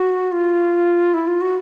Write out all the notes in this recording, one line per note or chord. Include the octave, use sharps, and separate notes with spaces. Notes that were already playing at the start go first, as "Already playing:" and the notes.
Already playing: F#4
F4
E4
F4
F#4